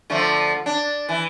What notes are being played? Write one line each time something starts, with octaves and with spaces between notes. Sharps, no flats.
D3 F3 A3
D4
E3